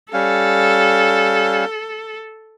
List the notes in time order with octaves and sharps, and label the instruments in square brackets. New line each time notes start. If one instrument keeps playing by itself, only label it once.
[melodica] G3 C#4 F5 [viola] A4